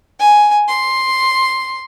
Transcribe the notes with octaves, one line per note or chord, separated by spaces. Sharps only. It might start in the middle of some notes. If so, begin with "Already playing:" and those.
G#5
C6